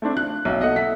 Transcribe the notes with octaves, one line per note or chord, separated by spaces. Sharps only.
A3 C4 D4
F4 F#6
B1 A#3 C4 E5
B3 A4 D#5 F#5
A4 E5 B6